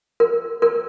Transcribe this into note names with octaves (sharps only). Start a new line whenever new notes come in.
A#4
A#4